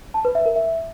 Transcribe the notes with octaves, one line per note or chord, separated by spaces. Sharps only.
A5
B4
E5
A#4
E5